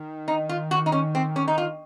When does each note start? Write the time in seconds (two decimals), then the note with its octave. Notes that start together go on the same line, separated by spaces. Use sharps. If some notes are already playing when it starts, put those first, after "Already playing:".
Already playing: D#3
0.28 D#4
0.49 F4
0.71 F#4
0.86 D#4
0.92 C#4
1.15 C4
1.36 C#4
1.48 D#4
1.58 F4